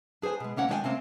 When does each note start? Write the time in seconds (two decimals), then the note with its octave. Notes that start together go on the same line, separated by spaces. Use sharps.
0.22 D4 G#4 B4 C5 G#5
0.40 B2 G#3
0.56 C3 A#3 C#4 F#5
0.69 D#3 G#3 D4 D5 G5 G#5
0.84 C3 A#3 C4 C#4